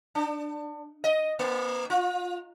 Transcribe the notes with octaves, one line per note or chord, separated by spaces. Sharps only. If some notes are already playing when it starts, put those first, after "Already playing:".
D4
D#5
A#3
F4